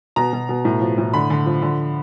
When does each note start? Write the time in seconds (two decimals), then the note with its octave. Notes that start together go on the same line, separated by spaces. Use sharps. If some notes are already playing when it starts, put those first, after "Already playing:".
0.16 B2 A#5
0.33 B2
0.49 B2
0.65 A2
0.81 F3
0.98 A2
1.14 D3 B5
1.30 D3
1.46 F3
1.62 D3